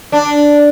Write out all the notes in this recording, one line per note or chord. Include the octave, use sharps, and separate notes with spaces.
D4